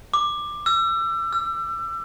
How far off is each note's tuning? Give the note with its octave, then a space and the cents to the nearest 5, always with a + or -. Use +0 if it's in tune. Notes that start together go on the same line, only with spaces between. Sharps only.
D6 +15
E6 +35
E6 +45